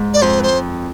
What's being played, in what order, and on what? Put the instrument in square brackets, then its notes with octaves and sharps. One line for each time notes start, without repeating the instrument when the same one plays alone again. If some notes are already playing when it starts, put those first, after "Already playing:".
Already playing: [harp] G#2
[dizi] D5
[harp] F2 [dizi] C5
[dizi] B4
C5